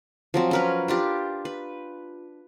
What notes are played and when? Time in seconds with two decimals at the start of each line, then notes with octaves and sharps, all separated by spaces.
0.34 F3 F#3 C4
0.51 C#4 A#4 B4
0.88 D4 F4 G4
1.45 B4